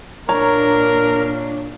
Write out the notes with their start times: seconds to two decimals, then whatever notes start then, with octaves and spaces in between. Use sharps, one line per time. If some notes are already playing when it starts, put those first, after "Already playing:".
0.29 A#2 D4 A#4 C#5 A#5